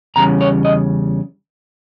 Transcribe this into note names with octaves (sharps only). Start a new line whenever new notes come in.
E2 C#3 G3 C#4 A#5
C#5
D#5